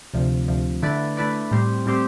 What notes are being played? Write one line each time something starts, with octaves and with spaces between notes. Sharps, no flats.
D2 C3 F3
D2 C3 F3
D3 A3 E4 B4 D5
D3 A3 E4 B4 D5
A2 G3 C4 G4 C5
A2 G3 C4 G4 C5